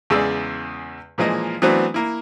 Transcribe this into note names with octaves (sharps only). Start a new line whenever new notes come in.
E2 C#3 G#3 G#4 D5 E6
A#2 E3 F3 G#3 A#3 D#5
E3 F#3 A3 B3 C4 D4
A#3 E4